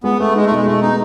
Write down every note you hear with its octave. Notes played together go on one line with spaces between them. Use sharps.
G#3 B3
A3 B3
G#3 D#4
A3
B2 G#3
G#3 A3
B3 D#4